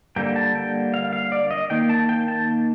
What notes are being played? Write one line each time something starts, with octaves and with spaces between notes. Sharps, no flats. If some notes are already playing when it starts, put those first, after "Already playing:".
D3 G3 A#3 G5
A5
G5
F5
F5
D5
D#5
D#3 A#3 G5
A5
G5
A5